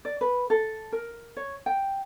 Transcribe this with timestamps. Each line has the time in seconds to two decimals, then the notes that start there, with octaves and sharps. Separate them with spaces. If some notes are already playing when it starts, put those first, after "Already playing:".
0.05 D5
0.21 B4
0.50 A4
0.92 A#4
1.37 C#5
1.66 G5